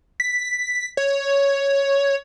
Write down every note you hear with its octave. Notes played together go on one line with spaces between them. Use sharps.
B6
C#5